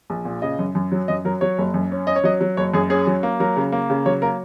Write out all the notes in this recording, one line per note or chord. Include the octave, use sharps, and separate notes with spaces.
A#1
A#2
C#3 D#5
F#2
F#2
F#3
F#2 D#5
F#3 A#4
F#3 C#5
F#1
F#2
C#4
C#4 D#5
C#5
F#3 D#5
F#3
F#1 C#5
F#2 G#4
C#4 G#4
F#3
A#3
F#3 A#4
C#3
A#3
C#3
F#3 C#5
A#3 A#4